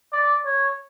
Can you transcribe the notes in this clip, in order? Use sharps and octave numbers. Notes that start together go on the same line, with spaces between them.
D5
C#5